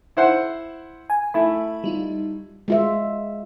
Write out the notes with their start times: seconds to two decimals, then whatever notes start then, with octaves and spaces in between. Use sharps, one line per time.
0.17 E4 C5 F#5
1.10 G#5
1.34 A3 E4 B5
1.84 G3 D#4 F4
2.68 G#3 F4 E5